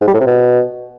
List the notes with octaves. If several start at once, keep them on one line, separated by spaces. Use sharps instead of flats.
G#2
G3
A2
C3
B2